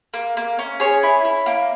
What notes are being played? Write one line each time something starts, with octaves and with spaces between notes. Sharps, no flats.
A#3
A#3
C#4
G#4 C#5
E4
E4
A#3